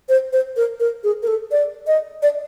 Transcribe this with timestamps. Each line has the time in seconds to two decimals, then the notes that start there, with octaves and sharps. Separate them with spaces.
0.09 C5
0.33 C5
0.57 A#4
0.80 A#4
1.04 G#4
1.23 A#4
1.27 A4
1.52 D5
1.87 D#5
2.23 D5